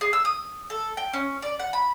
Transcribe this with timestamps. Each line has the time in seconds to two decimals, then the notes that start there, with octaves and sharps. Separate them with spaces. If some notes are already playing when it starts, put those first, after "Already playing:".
0.01 G#4
0.13 E6
0.25 D#6
0.70 A4
0.97 G5
1.13 C#4
1.42 D5
1.60 F#5
1.73 B5